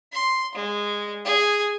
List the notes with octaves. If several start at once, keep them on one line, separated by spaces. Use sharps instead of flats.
C6
G#3
G#4